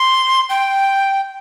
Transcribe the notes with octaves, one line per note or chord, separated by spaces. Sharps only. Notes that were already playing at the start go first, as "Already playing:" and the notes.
Already playing: C6
G5